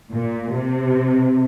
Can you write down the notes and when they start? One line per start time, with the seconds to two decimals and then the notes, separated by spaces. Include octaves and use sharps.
0.12 A#2
0.53 C3